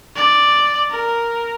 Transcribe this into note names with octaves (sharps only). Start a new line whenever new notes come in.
D5
A#4